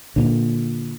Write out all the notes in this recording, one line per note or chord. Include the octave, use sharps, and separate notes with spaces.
A#2 D3